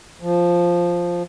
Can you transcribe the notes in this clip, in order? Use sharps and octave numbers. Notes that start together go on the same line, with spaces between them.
F3